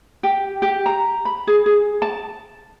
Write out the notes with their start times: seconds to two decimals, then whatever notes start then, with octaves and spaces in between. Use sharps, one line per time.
0.23 G4
0.62 G4
0.86 A#5
1.25 B5
1.47 G#4
1.66 G#4
2.02 A5